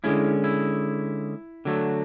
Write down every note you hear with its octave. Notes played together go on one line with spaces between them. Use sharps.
D3 G#3 C#4 E4
E4
D3 F#3 A3